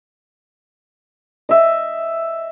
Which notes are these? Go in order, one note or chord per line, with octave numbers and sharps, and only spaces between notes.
D#5 E5